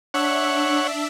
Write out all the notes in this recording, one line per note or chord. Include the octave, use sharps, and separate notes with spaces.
D4 C#5 E5 F#5